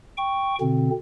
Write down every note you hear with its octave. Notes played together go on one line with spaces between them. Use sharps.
G5 C#6
B2 D3 C4